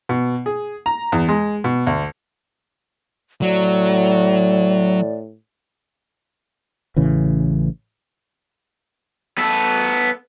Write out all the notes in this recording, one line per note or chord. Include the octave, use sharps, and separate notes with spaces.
B2
G#4
A#5
E2
G#3
B2
D2
A2 F#3 D5
A1 C#3 E3
B3 A4